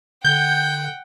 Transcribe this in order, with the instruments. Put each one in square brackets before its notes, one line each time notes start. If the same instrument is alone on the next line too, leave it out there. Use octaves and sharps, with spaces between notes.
[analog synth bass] D3 [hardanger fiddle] F#5 G5 [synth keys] G6